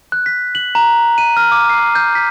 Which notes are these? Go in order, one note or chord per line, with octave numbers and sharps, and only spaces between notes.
F#6
B6
F#7
A#5
D#7
F6
D6
C7
G6
B6